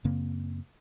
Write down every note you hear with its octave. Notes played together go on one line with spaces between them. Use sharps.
F#2 C#3 A#3 C4